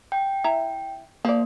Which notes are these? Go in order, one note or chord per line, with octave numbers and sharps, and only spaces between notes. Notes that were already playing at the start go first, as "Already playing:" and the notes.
G5
E4 E5 A#5
F3 A#3 D5